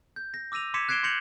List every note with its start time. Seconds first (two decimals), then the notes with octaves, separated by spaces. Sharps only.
0.16 G6
0.34 A#6
0.52 D6 E6 A#6 D#7 F7
0.74 C6 D6 G#6 B6 C#7 E7
0.89 F#6 G#6 C7 D7 E7 G7
1.03 C6 G6 A#6 C#7 F7 F#7